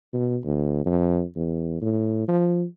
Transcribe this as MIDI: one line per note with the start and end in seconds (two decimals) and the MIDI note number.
0.13 0.38 47
0.44 0.85 38
0.86 1.23 41
1.36 1.78 40
1.82 2.27 45
2.28 2.65 53